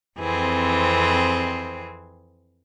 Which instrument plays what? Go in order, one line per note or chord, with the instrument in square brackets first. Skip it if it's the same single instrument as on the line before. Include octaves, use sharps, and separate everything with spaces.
[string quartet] F2 E3 C4 G#4